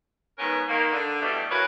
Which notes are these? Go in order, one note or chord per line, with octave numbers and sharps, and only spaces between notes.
G#2 D#3 B3 C#4 A#4 B4
D#3 A#3
D3
G2 B2 E3 G3 A3 D4
E3 F#4 A#4 B4 C#5 F5